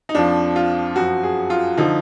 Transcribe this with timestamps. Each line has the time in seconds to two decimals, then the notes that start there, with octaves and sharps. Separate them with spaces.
0.09 D#4
0.15 F2 F3 D4
0.56 F4
0.96 F#2 F3 F#4
1.23 G#4
1.50 F4
1.78 D3 F3 D#4